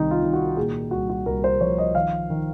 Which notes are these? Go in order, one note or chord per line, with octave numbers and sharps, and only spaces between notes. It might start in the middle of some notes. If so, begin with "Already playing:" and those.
Already playing: C2 C3 D#3 D#4
F4
D#3
F#4
A#2 G#4
C2 F#4
F#4
C2 A#4
C5
F3 C#5
D#5
D#3 F5
D#3